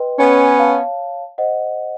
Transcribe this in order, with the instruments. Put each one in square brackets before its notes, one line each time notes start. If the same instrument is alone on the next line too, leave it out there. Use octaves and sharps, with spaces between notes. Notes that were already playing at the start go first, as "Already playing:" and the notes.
Already playing: [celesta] B4 D#5 G5 C6
[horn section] B3 C#4
[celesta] C#5 F5 A5
C5 D#5 F#5